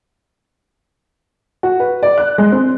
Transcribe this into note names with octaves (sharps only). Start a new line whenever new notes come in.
F#4
B4
D5
F#6
G#3
C4